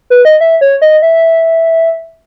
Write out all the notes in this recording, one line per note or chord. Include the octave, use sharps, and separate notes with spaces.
B4
D#5
E5
C#5
D#5
E5